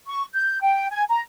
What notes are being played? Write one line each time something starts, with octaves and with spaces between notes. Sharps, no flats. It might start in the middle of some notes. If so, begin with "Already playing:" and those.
C#6
G6
G5
G#5
A#5